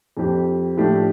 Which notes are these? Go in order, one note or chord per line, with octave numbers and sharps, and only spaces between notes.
F2 F3 C4 G4
A2 F3 A3 D4 G4